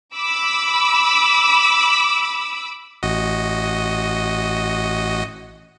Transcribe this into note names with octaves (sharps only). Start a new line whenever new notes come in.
B5 D6 E6
A1 F#4 D#5